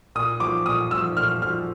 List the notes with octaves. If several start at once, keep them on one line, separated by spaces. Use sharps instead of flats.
A#2 D#6
F3 D6
A#2 D#6
F3 E6
A#2 F6
F3 F6